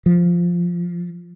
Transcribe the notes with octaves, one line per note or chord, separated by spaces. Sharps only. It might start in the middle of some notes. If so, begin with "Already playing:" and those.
F3